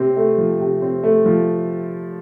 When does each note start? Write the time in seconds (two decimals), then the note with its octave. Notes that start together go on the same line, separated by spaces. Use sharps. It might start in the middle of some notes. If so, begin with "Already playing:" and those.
Already playing: C3 C4
0.17 A3
0.38 F3
0.60 C3
0.82 C4
1.03 A3
1.26 F3